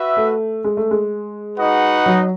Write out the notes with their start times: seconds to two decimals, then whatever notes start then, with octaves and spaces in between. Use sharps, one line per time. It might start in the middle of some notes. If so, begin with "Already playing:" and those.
Already playing: F#4 B4 E5
0.17 A3
0.64 G#3
0.77 A3
0.91 G#3
1.58 D#4 F#4 B4 D#5 F#5
2.06 F#3